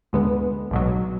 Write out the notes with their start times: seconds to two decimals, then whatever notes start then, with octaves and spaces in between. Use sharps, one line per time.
0.13 D2 D3 G#3 B3
0.71 B1 B2 F#3